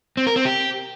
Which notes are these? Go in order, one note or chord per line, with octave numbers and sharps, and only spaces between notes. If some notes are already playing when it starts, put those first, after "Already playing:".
C4
A#4
C4
G4